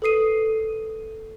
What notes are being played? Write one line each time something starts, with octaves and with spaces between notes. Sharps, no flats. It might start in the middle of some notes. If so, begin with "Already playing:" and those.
A4 B4 D#6 C7 D#7